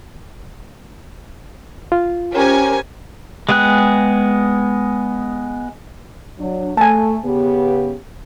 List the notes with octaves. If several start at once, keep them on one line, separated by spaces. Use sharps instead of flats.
F4
C#4 G4 A#4 C5 G#5
G#3 B3 G#4 G5 F#6
F#3 D4
A3 G#5 A5
C#3 B3 G4